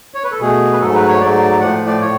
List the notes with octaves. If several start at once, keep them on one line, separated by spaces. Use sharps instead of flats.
C#5
B4
A4
B2 A3 G#4
B4
G#2 F#3 A3 A4
B4
C#5
G#2 F#3 A3 D5
A2 F3 A3 F#5
D5
A2 C#5